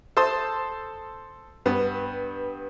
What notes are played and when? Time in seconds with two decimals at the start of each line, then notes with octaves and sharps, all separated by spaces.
0.17 A4 C5 C6 D#6
1.66 G2 B3